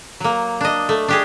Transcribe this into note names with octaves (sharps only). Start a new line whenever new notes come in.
F#3 A#3
D4 D#5
A3
D4 G4 G#4